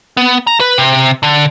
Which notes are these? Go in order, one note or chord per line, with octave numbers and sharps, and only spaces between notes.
B3
A#5
B4
C3
D3